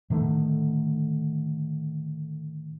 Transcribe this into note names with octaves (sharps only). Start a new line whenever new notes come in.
A2 D3 D#3 A3